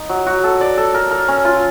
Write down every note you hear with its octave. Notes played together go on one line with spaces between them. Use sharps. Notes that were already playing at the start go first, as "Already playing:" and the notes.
Already playing: D#4
F#3
F#4
A4
D5
A4
A#4
A#4
C#4
F4